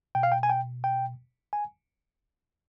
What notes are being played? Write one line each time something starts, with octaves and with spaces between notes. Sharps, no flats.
B2 G5
F5
G5
G#5
G5
G5
G#5